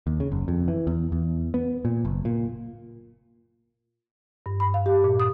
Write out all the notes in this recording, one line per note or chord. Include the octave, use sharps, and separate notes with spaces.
D#2
C#3
F#1
F2
E3
E2
E2
B3
A#2
F#1
A#2
G2
B5
F5
G4
A#2
D#6